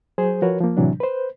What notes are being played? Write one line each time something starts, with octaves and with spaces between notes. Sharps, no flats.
F#3 G#4 C5
F3 F#4 A#4 B4 C#5
F3 A#3
A2 C3 E3 F#3 D4
B4 C5